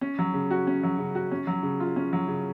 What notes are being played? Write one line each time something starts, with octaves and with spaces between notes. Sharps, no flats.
C#4
F#3
C#3
F#4
C#4
F#3
C#3
F#4
C#4
F#3
C#3
F4
C#4
F#3
C#3